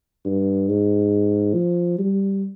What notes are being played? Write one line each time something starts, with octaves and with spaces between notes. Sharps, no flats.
G2
G#2
F3
G3